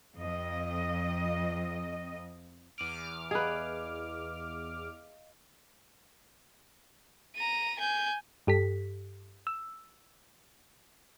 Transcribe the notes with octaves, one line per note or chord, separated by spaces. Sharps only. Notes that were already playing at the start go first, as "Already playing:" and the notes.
F2 D#5
E2 D6 F6 D7 D#7 F#7
G#4 B4 D#5 F5
A#5 D#7
G#5 G6
G2 G4 A4 B6
E6